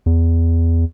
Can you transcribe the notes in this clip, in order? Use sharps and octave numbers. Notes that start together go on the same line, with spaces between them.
E2